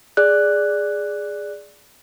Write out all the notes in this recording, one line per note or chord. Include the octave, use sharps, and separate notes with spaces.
G#4 D5 F#6